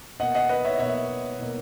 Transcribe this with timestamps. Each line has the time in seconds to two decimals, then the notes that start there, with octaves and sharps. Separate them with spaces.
0.20 B2 A#3 D#5 F#5
0.34 D#5 F#5
0.49 B4 D#5
0.65 C#5 E5
0.79 B2 A#3 C#5 E5
1.39 B2 A#3